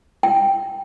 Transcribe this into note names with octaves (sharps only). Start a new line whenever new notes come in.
G5